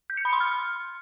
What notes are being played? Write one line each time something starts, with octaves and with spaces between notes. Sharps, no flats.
G6
C#7
B5
C6
F6